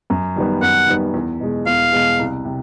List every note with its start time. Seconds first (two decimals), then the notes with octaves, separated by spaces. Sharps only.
0.10 F#2
0.36 D#3 G3 B3
0.62 F#2 F#5
0.88 D#3 G3 B3
1.14 E2
1.40 B2 G#3
1.66 E2 F5
1.92 B2 G#3
2.19 C2
2.45 C3